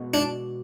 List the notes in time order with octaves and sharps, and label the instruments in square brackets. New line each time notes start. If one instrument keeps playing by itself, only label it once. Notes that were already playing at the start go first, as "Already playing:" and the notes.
Already playing: [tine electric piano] B2 G#3 B3 F#4
[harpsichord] D4